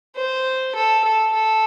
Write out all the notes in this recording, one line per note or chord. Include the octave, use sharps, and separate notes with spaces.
C5
A4
A4
A4